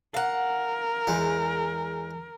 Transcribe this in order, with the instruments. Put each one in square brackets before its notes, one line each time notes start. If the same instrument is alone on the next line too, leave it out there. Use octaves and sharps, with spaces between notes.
[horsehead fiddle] A#4 [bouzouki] F5 F#5
[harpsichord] E2 G#3